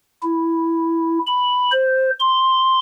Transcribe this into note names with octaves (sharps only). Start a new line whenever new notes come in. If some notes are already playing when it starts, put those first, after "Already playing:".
E4
B5
C5
C6